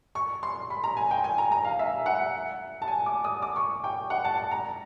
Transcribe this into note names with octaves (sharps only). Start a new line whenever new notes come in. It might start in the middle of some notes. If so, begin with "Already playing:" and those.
C#6
C6
B5
A#5
G#5
G5
G#5
A#5
A#5
F5
E5
F#5
A5
G#5
D6
D#6
D6
C#6
G5
F#5
A5
A5
A#5